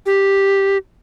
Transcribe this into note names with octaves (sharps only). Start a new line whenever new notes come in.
G4